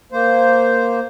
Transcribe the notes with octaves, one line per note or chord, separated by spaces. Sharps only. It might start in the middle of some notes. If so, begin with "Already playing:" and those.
A#3 C5